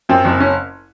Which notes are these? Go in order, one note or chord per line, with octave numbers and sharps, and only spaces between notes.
F#2 C4
F#1
C#4